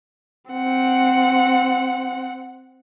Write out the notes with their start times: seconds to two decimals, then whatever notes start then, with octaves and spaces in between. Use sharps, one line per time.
0.51 C4 F#5